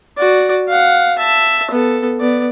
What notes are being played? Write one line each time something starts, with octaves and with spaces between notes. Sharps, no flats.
F#4 D5
F5 F#5
E5 A5
B3 A4
B3 D5